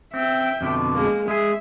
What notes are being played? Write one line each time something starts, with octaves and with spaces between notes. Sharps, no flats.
C4 E5 G5
F2 B2 D3
G#3 A#3
G#3 G#4 E5